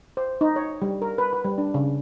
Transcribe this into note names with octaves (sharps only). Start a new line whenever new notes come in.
C5
D#4
C#5
G3
A#4
B4
B4
G3
D4
C#3